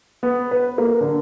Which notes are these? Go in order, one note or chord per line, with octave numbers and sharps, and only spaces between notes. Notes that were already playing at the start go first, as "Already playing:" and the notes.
B3
B4
A#3
D3